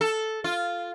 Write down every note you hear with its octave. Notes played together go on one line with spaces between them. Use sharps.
A4
F4